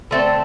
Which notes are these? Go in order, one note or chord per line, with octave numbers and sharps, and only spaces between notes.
D3 A3 C4